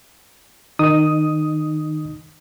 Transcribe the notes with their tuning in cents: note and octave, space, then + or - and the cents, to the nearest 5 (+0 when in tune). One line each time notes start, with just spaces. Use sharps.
D#3 +0 D#4 -25 D#6 +5